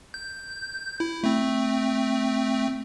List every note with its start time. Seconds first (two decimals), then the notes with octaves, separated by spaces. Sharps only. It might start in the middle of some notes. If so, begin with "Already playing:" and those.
0.14 G6
1.00 E4
1.24 A3 C4